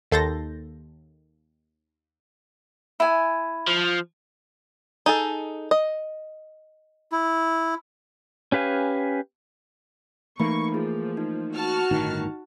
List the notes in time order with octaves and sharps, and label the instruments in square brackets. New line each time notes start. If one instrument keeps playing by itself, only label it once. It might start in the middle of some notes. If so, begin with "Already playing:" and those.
[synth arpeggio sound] D#2 A4 C6 G6 A6 A#6
[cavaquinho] E4 G#5
[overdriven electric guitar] F3
[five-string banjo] D#4 G#4 A4
D#5
[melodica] E4
[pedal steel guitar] C#4 G4 B4 F5 G#5
[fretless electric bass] E3 A3 A#3 [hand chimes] D#4 B5 [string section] C#6
[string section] F3 [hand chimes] G#4
[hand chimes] D#4
[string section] F#4 A5 F6
[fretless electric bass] G1 A2 D#3 [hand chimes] D#4